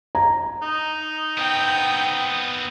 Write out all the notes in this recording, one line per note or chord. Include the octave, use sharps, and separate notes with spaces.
A#5
D#4
B3 C4 G5